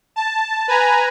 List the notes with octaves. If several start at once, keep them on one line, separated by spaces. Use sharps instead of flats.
A5
B4 G#5 A#5